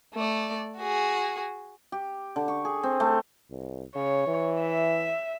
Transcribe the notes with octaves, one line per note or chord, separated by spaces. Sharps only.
A3 D5
F#4 G#4
G4
D3
C#6
G#4
C4
A3
C2
C#3 C#5
E3
E5